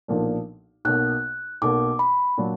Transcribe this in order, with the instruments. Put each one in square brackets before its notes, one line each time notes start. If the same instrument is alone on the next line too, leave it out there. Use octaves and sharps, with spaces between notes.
[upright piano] B1 A#2 F3 A#3 D4
[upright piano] B1 B2 A#3 [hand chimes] F#6
[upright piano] B1 B2 A#3 [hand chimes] D6
[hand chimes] B5
[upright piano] A#2 F#3 D4